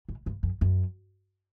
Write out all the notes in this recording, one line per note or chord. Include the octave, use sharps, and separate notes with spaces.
A2
G2
F#2
F#2